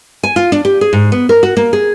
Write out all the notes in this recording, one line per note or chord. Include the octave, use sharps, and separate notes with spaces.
G#5
F4
D4
G4
G#4
G#2
B3
A#4
F#4
A#3
G#4